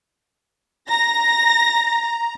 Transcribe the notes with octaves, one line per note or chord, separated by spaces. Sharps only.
A#5 A#6